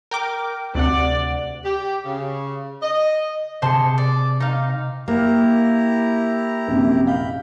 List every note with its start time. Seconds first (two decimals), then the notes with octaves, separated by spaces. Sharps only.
0.11 A#4 G5 D6
0.75 D2 C3 D5 F#5
1.65 G4
2.05 C#3
2.83 D#5
3.62 C3 G#4 C5 A5 C6 C#7
3.98 D5
4.40 C4 D#4 F5
5.08 A#3 E4 G4 A#5
6.68 A#1 F#2 C3
7.07 F5 B5 G6